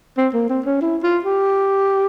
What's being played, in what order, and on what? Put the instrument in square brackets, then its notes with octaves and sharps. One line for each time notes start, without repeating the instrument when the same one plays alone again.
[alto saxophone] C4
A#3
C4
C#4
E4
F4
G4